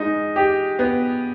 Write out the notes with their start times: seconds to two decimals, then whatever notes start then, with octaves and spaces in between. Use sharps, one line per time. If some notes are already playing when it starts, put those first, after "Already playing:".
Already playing: G#3 D#4
0.36 G4
0.79 B3